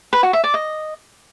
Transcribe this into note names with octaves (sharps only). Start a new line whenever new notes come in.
B4
F#4
E5
D5
D#5